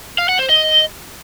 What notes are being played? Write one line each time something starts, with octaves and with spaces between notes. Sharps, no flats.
F5
F#5
C5
D#5